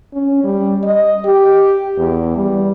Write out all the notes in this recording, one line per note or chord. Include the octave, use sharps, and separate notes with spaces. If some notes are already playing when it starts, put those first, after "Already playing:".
C#4
G3
D#5
G4
E2
G3